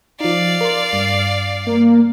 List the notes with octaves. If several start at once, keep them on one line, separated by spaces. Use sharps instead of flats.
F3 D#4 D5 F5
A#4 C6
G2
A#3